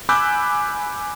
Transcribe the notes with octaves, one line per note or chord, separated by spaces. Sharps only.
G#5 B5 D6 E6 F#6 G6